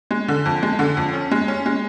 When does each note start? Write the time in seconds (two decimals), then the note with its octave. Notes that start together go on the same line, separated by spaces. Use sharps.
0.11 G#3
0.28 D3
0.45 F2
0.63 G#3
0.79 D3
0.97 F2
1.14 C#4
1.31 G#3
1.48 C#4
1.66 G#3